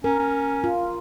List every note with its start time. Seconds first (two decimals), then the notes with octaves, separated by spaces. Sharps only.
0.04 C#4 A#4
0.19 C#4
0.64 F4